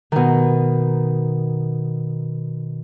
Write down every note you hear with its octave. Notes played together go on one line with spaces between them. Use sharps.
B2 D#3